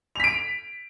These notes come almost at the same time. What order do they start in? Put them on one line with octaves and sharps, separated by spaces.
F7 B6 D7